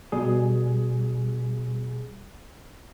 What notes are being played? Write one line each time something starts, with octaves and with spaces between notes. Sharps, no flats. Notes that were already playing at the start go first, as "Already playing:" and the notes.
B2 G3 G#4